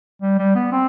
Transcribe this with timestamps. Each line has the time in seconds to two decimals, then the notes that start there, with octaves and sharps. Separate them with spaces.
0.22 G3
0.38 G3
0.55 B3
0.72 C4